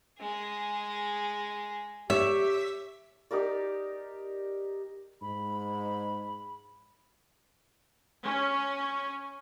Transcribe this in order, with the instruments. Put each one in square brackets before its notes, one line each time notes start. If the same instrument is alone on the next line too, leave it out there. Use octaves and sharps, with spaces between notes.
[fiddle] G#3 G#4
[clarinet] G4 [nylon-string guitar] C#5 [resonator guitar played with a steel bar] E5
[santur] D#4 G4 A#4 D5
[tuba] G#2 [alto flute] B5
[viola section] C#4